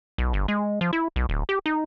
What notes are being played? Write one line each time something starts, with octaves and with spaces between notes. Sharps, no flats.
B1
G1
G#3
F3
E4
B1
D1
G4
D#4